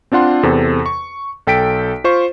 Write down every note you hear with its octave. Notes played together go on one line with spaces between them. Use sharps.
C4 D4 F4 F#5 C6
E2 C3 A4 C5
C#6
B1 A4 G5 B6 D7
F4 C5 C#6